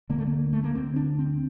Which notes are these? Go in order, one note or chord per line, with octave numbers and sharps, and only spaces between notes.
D2 D3 A#3
A3
A#3
A3
A#3
D2 D3 C4
D4
C4